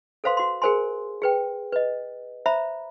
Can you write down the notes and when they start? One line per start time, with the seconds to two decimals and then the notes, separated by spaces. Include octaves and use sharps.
0.24 A4 B4 C5 F5 C6
0.37 F#4 C6
0.62 G#4 A#4 C5 G#5 C6
1.22 G#4 B4 G5
1.73 B4 D#5
2.46 C5 E5 A#5 B5